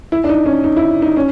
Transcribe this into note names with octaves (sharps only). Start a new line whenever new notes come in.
E4
D4
D#4
C#4
D#4
E4
D#4
C#4